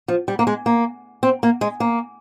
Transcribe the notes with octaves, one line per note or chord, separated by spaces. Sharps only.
F3
G3
A#3
G#3
A#3
C4
A#3
G#3
A#3